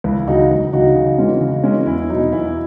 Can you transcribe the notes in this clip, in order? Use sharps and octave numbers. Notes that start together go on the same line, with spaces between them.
C#2 E4
C#3 F#3 D#4 F#4
C#2
C#3 F#3 D#4 F#4
C#3
E3 G#3 C#4
C#3
E3 G#3 C#4
E2 E4
B2 F#3 D#4
E2 E4